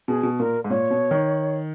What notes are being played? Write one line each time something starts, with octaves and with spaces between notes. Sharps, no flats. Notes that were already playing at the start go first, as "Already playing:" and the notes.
B2 G#4
B2
A#2 A#4
G#2
A#2 C#5
B2
D#3